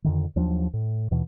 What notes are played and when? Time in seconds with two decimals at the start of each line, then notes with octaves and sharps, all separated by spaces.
0.04 F2 D3 D#3
0.36 D#2 F3 F#3 D4
0.73 A2
1.11 D#2 B2 E3